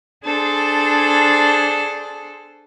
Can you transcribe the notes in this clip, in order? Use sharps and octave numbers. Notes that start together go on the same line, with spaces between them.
D4 G#4 A4 C5